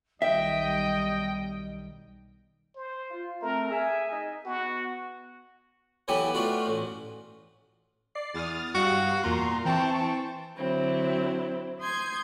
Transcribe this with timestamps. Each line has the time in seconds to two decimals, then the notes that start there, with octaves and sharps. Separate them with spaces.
0.22 B1 D#3 G3 D#5 E5 G5
2.76 C5
3.11 F4
3.42 A3 C4 A#4
3.71 G#4 E5 G#5
4.10 D#4 D#5
4.45 B3 F#4
6.08 E3 F#3 B3 G4 A4
6.34 A3 D4 F4 F#4
6.66 A1
8.15 D5 C7
8.34 E2 D#6 F6 A6
8.75 G2 G3 F#4 F5
9.24 E2 A#2 A#5 C6
9.65 E3 C4 A5 C#6
10.57 D3 F#3 C4 E4
11.80 C6 D#6 G6 G#6